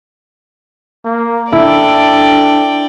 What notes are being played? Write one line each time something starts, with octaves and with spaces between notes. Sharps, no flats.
A#3
D4 E4 A4 D5 G5